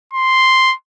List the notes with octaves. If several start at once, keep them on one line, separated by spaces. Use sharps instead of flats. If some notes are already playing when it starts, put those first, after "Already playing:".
C6